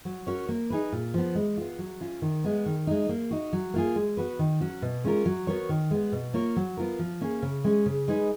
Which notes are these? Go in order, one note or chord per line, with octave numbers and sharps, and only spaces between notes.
F#3
C#4 F#4 A#4 C#5
A#3
D#4 G#4 B4
A#2
F3 B3
G#3
B3 F4
F#3
C#4 F4
D#3
G#3 B3
D#3
G#3 D#4
A#3
D#4 F#4
F#3
A#3 F4 G#4
G#3
B3 F#4 B4
D#3
F#3 C#4 F#4
B2
G#3 C#4 F4 A#4
F#3
B3 F#4 A#4 C#5
D#3
G#3 B3
B2
A#3 F4 A#4 C#5
F#3
B3 F4 A#4
F3
A#3 C#4 G#4
C#3
G#3 C#4
C#3
G#3 D#4 G#4 B4